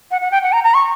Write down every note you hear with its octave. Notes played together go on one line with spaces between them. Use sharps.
F#5
F#5
G5
F#5
A#5
A#5
C#6